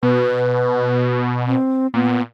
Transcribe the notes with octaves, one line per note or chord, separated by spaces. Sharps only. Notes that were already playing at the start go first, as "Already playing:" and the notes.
B2 B4
C4
A#2 B3